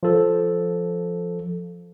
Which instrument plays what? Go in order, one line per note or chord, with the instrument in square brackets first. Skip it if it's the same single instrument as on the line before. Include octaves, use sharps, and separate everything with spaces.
[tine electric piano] F3 A4